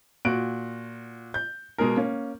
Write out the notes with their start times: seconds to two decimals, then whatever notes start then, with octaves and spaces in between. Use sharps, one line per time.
0.25 A#2 F#4 F#6 D7
1.34 G6
1.78 B2 G#3 G#4 A#4
1.97 A#3 C#4